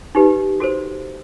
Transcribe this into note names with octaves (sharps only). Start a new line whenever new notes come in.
D#4 G4 B4
F#4 A4 C5